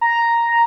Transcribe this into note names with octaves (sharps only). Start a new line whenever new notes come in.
A#5